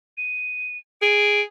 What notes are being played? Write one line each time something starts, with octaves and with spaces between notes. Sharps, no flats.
D#7
G#4 D7